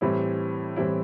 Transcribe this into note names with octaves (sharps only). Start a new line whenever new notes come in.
A2 E3 G3 C4 E4
A2 E3 G3 C4 E4